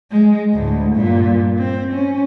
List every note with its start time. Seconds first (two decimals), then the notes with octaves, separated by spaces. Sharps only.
0.11 G#3
0.53 D2 A2
0.95 G2 A#2
1.58 C4
1.92 C#4